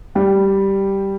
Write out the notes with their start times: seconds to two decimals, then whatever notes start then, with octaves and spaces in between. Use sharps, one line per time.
0.15 G3 G4